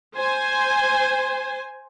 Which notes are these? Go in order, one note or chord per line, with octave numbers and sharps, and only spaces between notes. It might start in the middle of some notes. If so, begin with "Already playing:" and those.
C5 G#5